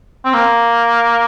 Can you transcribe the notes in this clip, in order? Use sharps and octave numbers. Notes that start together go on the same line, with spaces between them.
C4
A#3